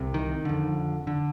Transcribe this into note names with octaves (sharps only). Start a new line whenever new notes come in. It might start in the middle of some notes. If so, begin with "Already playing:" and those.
Already playing: C2 C3
D#3
F2 D3
D3